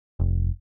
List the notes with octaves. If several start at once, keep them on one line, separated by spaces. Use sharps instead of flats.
F1